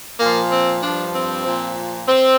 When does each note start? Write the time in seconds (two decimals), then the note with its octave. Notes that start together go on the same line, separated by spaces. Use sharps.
0.19 A#2 F3 A#3
0.51 C4
0.82 G2 F3 D4
1.14 C4
1.45 A#2 F3
2.08 C4